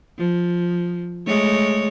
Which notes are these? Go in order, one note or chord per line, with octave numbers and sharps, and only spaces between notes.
F3
G#3 A3 C#5